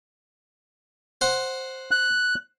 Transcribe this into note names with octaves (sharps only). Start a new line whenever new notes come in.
C5 F#5
F#6